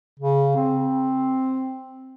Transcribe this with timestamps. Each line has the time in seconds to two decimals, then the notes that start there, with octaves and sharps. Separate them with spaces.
0.20 C#3
0.56 C4